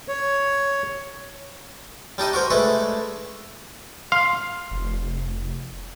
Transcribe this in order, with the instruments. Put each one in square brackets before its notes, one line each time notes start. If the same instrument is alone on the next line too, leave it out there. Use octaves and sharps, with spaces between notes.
[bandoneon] C#5
[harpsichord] G3 D4 D#4 D#5
F#4 A#4 C5
G#3 A3 D4 B4
[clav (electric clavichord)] F5 [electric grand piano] C6
[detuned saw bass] F1